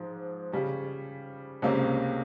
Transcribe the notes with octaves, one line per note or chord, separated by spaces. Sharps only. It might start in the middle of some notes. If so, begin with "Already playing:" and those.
Already playing: G#2 F3 G#3
C#3 G3 C#4
C#2 C3 G3 A#3 C#4